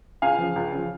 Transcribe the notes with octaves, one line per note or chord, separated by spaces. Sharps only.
C#2 F5 G#5
C#3 F3
C#2
C#3 F3